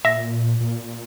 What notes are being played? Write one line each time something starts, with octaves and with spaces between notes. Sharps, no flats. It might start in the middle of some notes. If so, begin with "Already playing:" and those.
A#2 E5 A#6
A#2